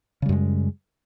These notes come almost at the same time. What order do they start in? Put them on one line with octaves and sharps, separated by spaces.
C#3 G3 F#2 G#3